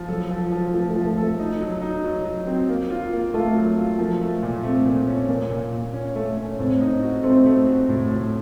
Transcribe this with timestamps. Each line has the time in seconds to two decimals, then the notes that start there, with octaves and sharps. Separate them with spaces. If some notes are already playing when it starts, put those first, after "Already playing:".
Already playing: F3
0.08 F#3 A4
0.31 F3
0.52 F3
0.74 F3 A3
0.90 A3
0.96 F3
1.06 A3
1.18 A4
1.23 A3
1.39 D#4
1.61 F#3
1.82 D#4
2.04 F#3
2.25 F#3
2.47 C4
2.69 A#3
2.90 F4
3.13 A#3
3.34 A3 F4
3.55 F#3
3.78 F4
3.98 F3 A#3
4.21 A3
4.42 A#2
4.63 A3 C4
4.85 A#2
5.07 C#4
5.28 A#2 A#3
5.50 A#2
5.73 A#2
5.94 C#4
6.16 A3
6.37 C#4
6.59 A2 C4
6.81 D#4
7.03 F#4
7.23 A3 C4
7.45 A3
7.67 F#4
7.89 A2
8.11 A2